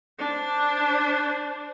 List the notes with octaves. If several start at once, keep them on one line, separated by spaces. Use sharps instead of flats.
D4 C5